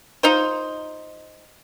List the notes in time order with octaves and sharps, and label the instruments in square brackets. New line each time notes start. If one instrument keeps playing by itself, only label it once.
[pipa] D#4 F4 C5